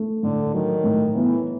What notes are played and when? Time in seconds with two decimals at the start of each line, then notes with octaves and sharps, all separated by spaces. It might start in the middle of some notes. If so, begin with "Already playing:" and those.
Already playing: A3
0.23 A2 D3
0.54 D#3 F#3
0.84 A2
1.14 E3 B3